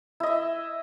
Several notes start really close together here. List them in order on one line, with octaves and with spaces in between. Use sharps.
E4 D#5 E5